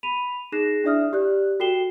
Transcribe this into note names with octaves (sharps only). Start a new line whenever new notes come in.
B5 B6 D#7 F7
D#4 G#4 F#6 A#6 C7 E7
D4 E4 D5 E5 D#6 F6
G4 D5 F#6
F#4 A4 G5 C7 E7 G7